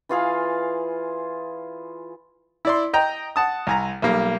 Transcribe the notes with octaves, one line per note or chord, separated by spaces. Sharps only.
E3 F4 G#4 F5
E4 D5 C6
D#5 G5 A#5
F#5 A5 D#6
C2 G#5 A#5
B1 G3 A#3